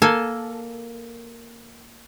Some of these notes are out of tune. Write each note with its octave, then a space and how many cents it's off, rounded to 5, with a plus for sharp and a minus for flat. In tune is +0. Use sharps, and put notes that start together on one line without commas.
A#3 +0 A4 +0 G#5 +20